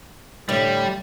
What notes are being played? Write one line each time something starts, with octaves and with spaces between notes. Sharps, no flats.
A2 D3 G3